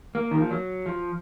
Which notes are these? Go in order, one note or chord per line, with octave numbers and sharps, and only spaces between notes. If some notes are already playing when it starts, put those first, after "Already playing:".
A#3
D#3
F3
F#3
F3